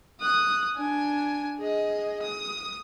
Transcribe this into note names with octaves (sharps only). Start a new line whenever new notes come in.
D#6 F#6
D4 G#5
G#4 D#5
D#6